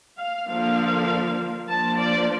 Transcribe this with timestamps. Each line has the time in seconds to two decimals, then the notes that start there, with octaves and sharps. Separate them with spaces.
0.18 F5
0.47 D3 F3 A#3 D4 F5
1.67 F3 A#3 D4 A5
1.98 D5